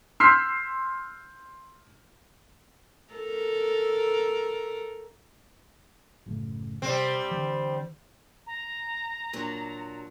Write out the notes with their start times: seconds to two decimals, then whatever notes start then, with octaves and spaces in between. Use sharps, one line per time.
0.20 C6 E6 F6 G6 B6 C7
3.14 A4 A#4
6.26 F#1 A2 C#3
6.82 C3 G3 C4
7.31 D3 E3
8.46 A#5
9.33 A#2 F#3 D4